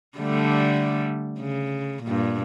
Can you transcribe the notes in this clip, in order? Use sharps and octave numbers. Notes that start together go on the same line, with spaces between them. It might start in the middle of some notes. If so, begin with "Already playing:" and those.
D3 G3 A3
C#3
G2 A#2